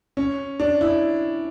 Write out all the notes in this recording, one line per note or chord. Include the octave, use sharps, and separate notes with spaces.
C#4
D4
E4